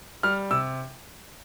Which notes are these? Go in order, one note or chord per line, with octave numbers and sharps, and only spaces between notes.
G3 F6
C3 E6